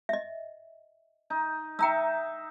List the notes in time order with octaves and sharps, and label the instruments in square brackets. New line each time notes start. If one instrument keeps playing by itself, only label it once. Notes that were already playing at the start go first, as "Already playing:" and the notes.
[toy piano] D#5 E5
[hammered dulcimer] D#4
[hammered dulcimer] D#4 E5 [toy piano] G5 A#5 E6